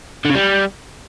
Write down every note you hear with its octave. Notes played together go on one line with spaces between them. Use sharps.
D3
C#3
G3